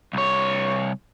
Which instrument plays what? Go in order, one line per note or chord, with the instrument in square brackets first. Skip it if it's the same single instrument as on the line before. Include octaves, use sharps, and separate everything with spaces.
[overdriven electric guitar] C2 C#5